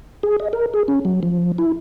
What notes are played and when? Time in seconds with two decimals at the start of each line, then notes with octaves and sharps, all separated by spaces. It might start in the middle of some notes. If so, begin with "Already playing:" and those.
0.23 G#4
0.40 D#5
0.53 A#4
0.74 G#4
0.88 C#4
1.05 F#3
1.23 F3
1.58 E4